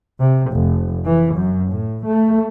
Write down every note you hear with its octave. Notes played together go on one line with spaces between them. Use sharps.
C3
F1
E3
F#2
A2
A3